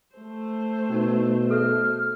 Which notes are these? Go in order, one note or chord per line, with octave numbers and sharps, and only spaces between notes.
A3 C5
B2 C#4 D#4 A5
A4 E5 F6